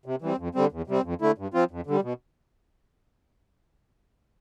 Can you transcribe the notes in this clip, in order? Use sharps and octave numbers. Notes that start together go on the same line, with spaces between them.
C3
E3 G3 C4
F2
D3 G3 C4
E2
C3 G3 C4
F2
D3 A3 E4
G2
F3 C4 F4
F2
D3 G3
B2